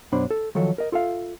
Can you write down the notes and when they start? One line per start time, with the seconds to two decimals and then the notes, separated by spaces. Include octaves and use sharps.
0.12 F#2 B2 D4 C5 B5
0.30 A4
0.55 D#3 F3 F#3 A4
0.78 A#4 D#5
0.92 F4 A4 E5 F5